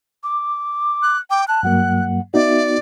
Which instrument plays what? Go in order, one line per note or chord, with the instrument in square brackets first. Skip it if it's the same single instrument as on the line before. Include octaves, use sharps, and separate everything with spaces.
[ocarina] D6
[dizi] F#6
[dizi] G5 [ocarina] D6
[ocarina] A5 [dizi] F#6
[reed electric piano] G2 F#3 A#3 [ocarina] F#5
[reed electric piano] B3 D#4 F#4 [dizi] D5 [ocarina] E5